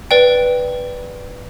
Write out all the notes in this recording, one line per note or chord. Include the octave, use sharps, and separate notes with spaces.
B4 D5 G5